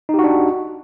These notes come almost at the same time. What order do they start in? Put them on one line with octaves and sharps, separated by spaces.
D#4 G4 F#4 D4